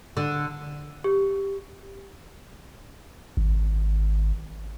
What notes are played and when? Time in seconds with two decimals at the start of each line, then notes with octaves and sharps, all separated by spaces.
0.17 D3
1.04 G4
3.37 G#1